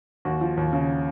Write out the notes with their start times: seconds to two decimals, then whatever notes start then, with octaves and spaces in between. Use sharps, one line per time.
0.25 D#2 F#4
0.41 F3
0.57 D#2
0.73 C#3